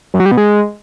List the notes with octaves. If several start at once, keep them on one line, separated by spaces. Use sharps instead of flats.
F#2
F#3
G3
B2
G#3